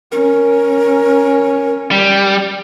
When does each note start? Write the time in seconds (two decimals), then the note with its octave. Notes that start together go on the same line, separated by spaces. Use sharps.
0.12 C#4 A#4
1.91 G3